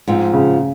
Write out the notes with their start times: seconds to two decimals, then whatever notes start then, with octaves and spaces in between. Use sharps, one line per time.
0.08 G#2 F3 C4
0.33 C#3